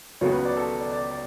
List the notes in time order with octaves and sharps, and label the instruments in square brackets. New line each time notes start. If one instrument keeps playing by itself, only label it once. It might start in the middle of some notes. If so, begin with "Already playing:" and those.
[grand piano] C#2 C#3 F#3 B3 [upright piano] C#5
[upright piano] B4
D5
A4
D5
D5
D5